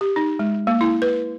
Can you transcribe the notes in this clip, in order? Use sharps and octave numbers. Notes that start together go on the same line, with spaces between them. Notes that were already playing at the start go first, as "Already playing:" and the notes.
G4
D#4
G#3
A#3
E4
B4